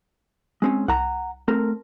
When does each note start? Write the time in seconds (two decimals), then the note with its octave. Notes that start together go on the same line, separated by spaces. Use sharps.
0.62 G#3 C4 C#4
0.88 C2 F#5 A#5
1.48 A3 C4 A#4